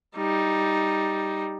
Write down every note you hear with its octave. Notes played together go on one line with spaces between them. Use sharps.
G3 D#4